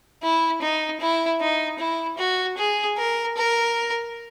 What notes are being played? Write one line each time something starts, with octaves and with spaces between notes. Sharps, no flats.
E4
D#4
E4
D#4
E4
F#4
G#4
A#4
A#4